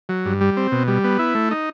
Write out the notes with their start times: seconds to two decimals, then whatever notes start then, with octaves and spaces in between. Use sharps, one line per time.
0.09 F#3
0.25 G2
0.41 G3
0.57 C4
0.72 B2
0.88 G3
1.04 B3
1.19 E4
1.35 A3
1.51 D#4